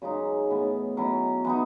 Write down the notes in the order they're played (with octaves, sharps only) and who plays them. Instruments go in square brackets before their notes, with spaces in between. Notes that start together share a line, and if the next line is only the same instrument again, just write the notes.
[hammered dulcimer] F#2 C#3 G#3 D#4
A2 E3 B3
B2 F#3 C#4 E4
E3 B3 D#4